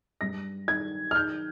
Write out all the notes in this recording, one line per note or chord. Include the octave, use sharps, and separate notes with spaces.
G2 A#6
D#3 G#6
F6
D#3 G6